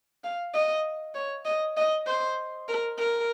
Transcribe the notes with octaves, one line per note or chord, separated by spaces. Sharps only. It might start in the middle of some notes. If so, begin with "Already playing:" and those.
F5
D#5
C#5
D#5
D#5
C5
A#4
A#4